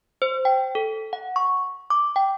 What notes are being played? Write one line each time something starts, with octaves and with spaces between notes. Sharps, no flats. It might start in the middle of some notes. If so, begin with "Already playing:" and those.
C5
G5
A4
F#5
C#6
D6
G5